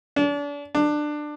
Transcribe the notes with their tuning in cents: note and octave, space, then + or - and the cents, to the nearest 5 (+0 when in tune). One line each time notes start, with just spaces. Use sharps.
D4 -35
D4 +20